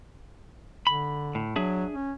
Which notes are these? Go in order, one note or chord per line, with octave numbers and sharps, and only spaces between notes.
D3 B5
A2
F#3 D4 G#4 E5
C#4